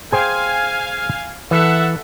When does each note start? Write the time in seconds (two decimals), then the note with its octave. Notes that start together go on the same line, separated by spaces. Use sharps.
0.12 G#4 C5 F5 G5 G#5
1.51 E3 A4 E5 F#5